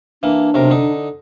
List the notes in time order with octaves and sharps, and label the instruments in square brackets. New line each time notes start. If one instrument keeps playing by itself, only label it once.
[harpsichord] E3 A#3 [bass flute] D4
[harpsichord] B1 C3 A#4
D3 D#4